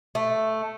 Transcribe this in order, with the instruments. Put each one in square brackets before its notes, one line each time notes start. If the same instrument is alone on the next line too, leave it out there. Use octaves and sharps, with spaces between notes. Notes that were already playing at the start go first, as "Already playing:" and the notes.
[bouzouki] A3